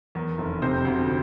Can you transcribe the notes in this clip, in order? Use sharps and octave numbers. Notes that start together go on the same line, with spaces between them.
E2 A#4
F1
C3 C5
D2